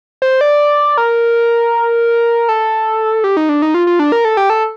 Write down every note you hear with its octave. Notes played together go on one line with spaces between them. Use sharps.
C5
D5
A#4
A4
G4
D#4
D4
D#4
F4
F4
D4
A#4
A4
G4
A4